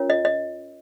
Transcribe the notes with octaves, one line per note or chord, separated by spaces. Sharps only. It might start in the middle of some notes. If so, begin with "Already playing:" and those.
Already playing: C#4 F4 A#4 C#5
D#5
D#5